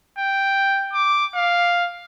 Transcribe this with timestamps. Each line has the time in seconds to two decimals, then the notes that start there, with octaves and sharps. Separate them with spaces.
0.19 G5
0.93 D6
1.35 F5